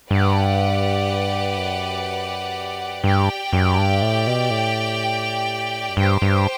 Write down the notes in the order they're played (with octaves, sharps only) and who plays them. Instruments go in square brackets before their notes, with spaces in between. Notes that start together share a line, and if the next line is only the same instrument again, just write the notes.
[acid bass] G2 [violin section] G4 B4 D5 F#5
[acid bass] F#2
[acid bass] G2 [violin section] G4 D5 G5
[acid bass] F#2
G2
A2
B2
A2
F#2
[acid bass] G2 [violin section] G4 C5 G5
[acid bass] G2